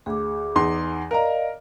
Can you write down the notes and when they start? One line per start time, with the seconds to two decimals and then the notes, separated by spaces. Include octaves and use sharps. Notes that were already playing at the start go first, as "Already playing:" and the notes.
0.06 D2 G#4 D6
0.55 E2 D#4 C6
1.11 A#4 D5 D#5 F5 A#5